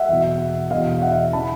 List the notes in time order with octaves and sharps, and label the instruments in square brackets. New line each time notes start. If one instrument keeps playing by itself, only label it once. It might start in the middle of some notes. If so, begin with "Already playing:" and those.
Already playing: [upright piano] E5 F#5
E2 B2
E2 B2 D#5 F5
E5 F#5
C#3 E3 A5 B5